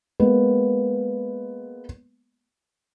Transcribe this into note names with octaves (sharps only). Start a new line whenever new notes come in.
G#3 A#3 B3